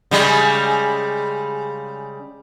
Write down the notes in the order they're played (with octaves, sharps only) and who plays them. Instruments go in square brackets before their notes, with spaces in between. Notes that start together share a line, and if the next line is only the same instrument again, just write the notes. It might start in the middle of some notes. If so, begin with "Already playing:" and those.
[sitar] C#3 G3 G#3